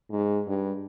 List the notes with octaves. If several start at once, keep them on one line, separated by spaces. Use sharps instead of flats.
G#2
G2